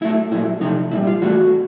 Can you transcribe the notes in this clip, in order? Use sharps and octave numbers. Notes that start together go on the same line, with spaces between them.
A2 F#3 A3 E4
A#2 F#3 A3 E4
C3 F3 A3 D#4
A#2 G3 E4
F4
A2 E3 A3 F#4